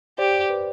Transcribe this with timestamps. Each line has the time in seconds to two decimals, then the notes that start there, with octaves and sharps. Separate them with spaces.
0.18 G4 C5 D5
0.50 B4